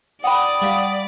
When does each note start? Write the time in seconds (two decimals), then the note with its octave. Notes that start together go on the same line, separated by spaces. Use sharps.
0.24 D5 F#5 G5 B5 D#6
0.62 G3 F5 B6